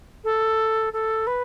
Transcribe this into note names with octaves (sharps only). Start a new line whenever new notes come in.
A4
A4
B4